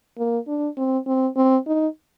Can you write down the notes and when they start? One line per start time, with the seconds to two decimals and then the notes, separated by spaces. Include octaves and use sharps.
0.18 A#3
0.47 D4
0.77 C4
1.07 C4
1.36 C4
1.66 D#4